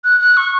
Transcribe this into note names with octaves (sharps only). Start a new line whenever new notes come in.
F#6
F#6
C#6